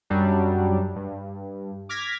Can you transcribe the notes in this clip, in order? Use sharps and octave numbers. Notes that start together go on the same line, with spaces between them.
F#2 F#3 G3 D4
G2
D6 F6 G#6 A#6 B6